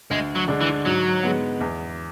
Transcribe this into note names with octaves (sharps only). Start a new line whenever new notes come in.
D2 G#3
F#3
D3 G#3 D4
E3
G#2 F#3
G#3 B3
E2